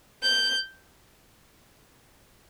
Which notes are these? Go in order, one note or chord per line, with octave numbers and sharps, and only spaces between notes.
G6